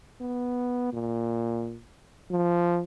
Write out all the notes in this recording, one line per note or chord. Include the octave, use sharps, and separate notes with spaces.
B3
A#2
F3